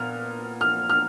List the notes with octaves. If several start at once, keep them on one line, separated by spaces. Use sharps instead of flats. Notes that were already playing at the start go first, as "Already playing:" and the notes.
Already playing: A#2 B3 F6
F6
F6